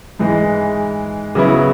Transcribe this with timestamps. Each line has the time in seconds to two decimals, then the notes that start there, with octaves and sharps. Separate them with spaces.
0.19 G#2 E3 G#3
1.35 C#3 F#3 B3 E4